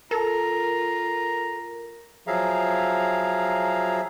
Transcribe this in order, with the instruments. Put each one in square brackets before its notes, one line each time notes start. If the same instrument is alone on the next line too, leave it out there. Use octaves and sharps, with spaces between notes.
[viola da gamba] F4 [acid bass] A4 [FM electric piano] A#4 [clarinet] A#5
[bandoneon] F3 F#3 G#4 E5 F5 A#5